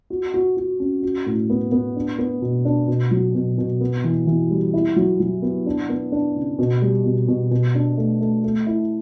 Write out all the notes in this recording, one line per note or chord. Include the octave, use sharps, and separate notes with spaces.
F#4
F#4
F#4
C#4
F#4
A2
B3
B3
D4
B3
B2
D4
B2
F#3
B2
B2
B3
E3
E3
G3
E4
F#3
F#3
B3
D4
B3
D4
C#3
B2
G3
B2
B2
B2
D4
A3
A3
A3
E4